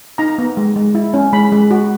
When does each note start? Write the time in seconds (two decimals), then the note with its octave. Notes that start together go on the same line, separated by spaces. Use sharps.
0.18 D#4 A#5
0.38 B3
0.57 G#3
0.76 G#3
0.95 E4
1.14 C#4
1.33 G#3 B5
1.52 G#3
1.71 F#4